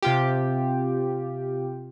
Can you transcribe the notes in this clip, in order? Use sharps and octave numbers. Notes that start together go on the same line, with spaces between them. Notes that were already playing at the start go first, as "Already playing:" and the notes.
C3 F4 G4